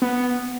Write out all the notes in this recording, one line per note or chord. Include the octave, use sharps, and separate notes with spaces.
B3